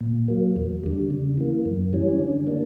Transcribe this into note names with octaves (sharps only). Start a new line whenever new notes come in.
A#2
F#3 A#3
E2
D3 G3
C#3
E3 A#3
F#2
E3 G3 C#4
D3
A#3 D4